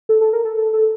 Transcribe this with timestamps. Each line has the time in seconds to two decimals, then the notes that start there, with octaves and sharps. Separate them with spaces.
0.09 A4
0.21 A4
0.33 A#4
0.45 A4
0.57 A4
0.73 A4